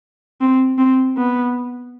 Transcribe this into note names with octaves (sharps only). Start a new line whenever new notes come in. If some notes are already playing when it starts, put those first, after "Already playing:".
C4
C4
B3